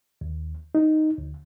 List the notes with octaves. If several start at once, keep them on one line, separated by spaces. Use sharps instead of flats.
D#2
D#4
D2